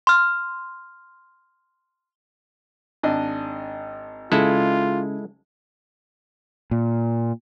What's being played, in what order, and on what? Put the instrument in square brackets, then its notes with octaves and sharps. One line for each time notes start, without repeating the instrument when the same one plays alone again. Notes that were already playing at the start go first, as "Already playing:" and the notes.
[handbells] C6 F6
[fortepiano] G#1 D4 D#5
[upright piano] C#3 [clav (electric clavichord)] G#3 E4 A4 [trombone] F4
[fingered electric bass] A#2